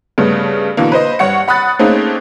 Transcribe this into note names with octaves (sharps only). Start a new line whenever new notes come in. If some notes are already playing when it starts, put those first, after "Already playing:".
G2 C#3 A3 B3
B2 D3 E3 A#3
B4 C5 D#5
G2 C#5 F#5 C#7
F#5 B5 D#6 F#6 A6
A3 A#3 C4 C#4 D#4 G#4